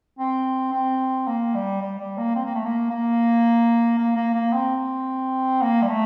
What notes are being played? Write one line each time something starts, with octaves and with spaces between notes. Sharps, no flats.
C4
C4
A#3
G3
G3
G3
A#3
C4
A#3
A3
A#3
A#3
A#3
A#3
A#3
C4
A#3
G3
A3